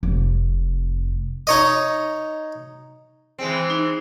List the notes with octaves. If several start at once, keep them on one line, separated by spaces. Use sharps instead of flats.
F1
D#4 C#5 D#5
E3 G#3 C4
D#4